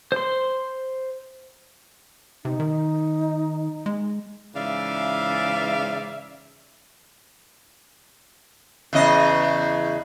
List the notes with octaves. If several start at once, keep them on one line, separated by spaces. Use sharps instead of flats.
C5 C6
C3 D#4
D#3
G#3
G#2 C#3 E3 D5 E5 F5
E2 C#3 D#5